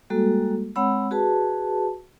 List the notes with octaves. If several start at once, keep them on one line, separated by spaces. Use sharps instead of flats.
G3 G#3 A#3 F#4 A4
G#3 C4 C#5 F#5 B5 E6
F#4 G#4 B4 A5